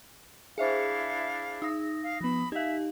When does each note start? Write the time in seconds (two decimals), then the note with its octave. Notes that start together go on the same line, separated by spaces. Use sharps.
0.58 D4 E4 G#4 C5 E5 F5 C#7
1.62 D#4 D#6 A#6
2.03 F5
2.21 F3 B3 B5
2.52 D#4 G4 E5 F5